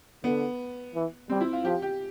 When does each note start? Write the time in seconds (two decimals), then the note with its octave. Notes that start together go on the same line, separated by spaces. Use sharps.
0.24 D3 B3
0.95 E3
1.29 G3 C4
1.41 E4
1.53 F4
1.64 F3 G4
1.82 G4